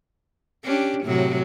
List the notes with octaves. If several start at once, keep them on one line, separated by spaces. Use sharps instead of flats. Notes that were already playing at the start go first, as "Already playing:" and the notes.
C#4 D4 G4
A2 C3 F#3